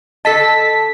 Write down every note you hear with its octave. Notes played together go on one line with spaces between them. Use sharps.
D3 A4 D#5 A5 B6